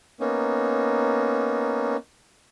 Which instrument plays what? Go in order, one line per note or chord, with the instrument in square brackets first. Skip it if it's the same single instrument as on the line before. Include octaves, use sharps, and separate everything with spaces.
[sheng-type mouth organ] A#3 B3 C#4 D#4